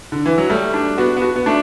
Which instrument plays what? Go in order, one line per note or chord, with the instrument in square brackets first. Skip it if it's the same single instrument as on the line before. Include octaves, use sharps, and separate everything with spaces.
[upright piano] D3
E3
F#3
[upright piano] G3 [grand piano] A3
[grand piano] D4
[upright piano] B3 [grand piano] F#4
[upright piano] B3
[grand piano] F#4
[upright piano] B3
[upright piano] A3 [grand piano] D4